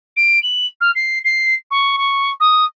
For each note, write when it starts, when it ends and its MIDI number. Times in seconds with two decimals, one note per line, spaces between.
0.16 0.41 98
0.43 0.66 102
0.81 0.91 89
0.95 1.19 96
1.24 1.54 96
1.71 1.96 85
1.98 2.30 85
2.40 2.64 87